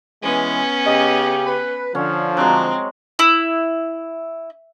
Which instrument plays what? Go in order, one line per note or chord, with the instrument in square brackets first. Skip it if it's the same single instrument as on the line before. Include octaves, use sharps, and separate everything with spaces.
[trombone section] E3 G#3 [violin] B3 C#4
[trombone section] C#3 G4 [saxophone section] D#5
[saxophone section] B4
[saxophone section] D3 [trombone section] F3 [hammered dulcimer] C#4
[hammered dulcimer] F#3 G#3 [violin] C4
[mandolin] E4